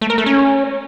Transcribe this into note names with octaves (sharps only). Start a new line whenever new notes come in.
A3
A#4
A3
C#4